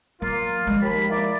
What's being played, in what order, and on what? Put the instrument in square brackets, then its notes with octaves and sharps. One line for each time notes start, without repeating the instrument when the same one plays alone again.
[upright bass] F#3 [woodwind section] A#3 F4
[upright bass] F3 G#3
[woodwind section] D#2 B5
A#3 E4 D5